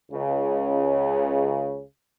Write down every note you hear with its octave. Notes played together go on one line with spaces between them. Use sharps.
C#2 C#3